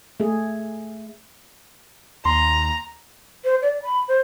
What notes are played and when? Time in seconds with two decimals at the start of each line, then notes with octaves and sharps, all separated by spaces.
0.20 A3 G#4
2.25 D#2 A#5 C6
3.44 C5
3.62 D5
3.83 B5
4.08 C5